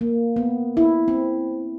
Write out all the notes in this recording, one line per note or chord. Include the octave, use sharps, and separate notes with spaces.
A#3
B3
E4
C4